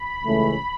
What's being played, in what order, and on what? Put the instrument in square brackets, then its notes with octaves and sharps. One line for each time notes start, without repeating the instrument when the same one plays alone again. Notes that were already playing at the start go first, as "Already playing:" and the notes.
Already playing: [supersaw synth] B5
[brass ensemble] C#2 C#3 E3 A3 C#4